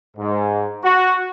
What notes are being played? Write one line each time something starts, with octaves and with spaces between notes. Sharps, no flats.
G#2
F#4